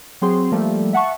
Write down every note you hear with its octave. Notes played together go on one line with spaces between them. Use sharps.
F#3 C4 G#4 C6
F3 G3 A3 A#3
E5 F#5 A5 C#6